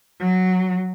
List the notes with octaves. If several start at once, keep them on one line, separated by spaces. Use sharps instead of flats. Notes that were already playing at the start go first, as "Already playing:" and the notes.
F#3